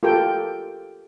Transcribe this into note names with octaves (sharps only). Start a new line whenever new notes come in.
F4 G4 A4 A#4 G5